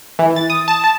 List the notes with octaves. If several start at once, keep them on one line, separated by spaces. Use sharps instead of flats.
E3
A6
D#6
A5
A5